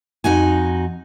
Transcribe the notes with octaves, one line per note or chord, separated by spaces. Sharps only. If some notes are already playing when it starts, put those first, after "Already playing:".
F2 D#4 F#4 G#5